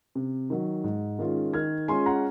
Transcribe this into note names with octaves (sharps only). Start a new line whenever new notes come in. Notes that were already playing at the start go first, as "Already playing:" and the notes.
C3
D#3 F#3
G#2
D#3 G#3 C#4 F4
D#3 F6 G#6
G#3 C#4 F4 G#5 C6
F#5 A#5